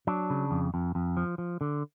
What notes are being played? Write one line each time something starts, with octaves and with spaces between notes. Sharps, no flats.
F#3 D4
C#3
F2
F2
F2
F3
F3
D3